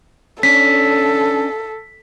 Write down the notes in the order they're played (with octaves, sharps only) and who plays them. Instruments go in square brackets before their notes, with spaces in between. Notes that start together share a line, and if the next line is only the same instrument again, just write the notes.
[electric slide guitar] C#4 D4 [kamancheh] A4 [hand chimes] B6